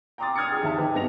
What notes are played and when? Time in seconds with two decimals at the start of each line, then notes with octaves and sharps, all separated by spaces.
0.18 G5 A#5 C6 D6 D#6 A6
0.36 D#6 F6 G#6 A6 C#7
0.51 G4 G#4
0.63 D#2 E5 A5
0.78 D#4 G4 B4
0.95 G2 B3 A#6 F7